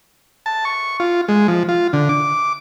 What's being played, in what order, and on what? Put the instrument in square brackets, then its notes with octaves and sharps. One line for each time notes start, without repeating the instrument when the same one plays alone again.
[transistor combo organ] A5
C#6
F4
G#3
F3
F4
D3
D6